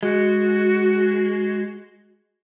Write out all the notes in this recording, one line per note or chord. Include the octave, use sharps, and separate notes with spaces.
G#3 F#4